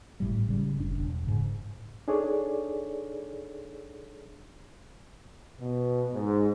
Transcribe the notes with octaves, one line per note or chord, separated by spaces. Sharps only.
G#1 A2 G3
C#3 G3
F#1 D4
E1
G#2 C#3
D4 D#4 G#4 A4 C#5 D5
B2
G#2